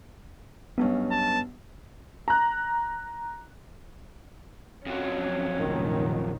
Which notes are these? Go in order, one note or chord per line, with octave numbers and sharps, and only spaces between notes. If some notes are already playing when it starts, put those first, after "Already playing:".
B1 G2 B3 C#4
A5
A#5 F#6
F2 F#3 C#4
F1 A#1 D#3